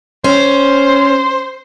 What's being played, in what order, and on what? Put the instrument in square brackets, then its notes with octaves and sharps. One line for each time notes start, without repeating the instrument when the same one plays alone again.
[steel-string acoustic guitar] C#4 [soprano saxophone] C5